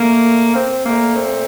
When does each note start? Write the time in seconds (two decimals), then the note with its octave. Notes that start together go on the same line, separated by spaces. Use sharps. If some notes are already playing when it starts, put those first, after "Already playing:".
Already playing: A#2 A3 A#3
0.56 C4
0.86 A#2 A3 A#3
1.16 C4